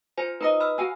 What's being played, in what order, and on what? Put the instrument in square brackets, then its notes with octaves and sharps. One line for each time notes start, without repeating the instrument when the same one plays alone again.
[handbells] F4 C5 G#5
[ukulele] D#4 D#5 [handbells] B4 A#5 D#6
[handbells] B5 E6 F6
[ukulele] F#4 F5 G#5 [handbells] E6